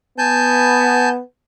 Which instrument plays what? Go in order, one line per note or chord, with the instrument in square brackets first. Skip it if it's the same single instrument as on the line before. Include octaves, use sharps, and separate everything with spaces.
[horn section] B3 [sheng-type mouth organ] G#5 A5 G6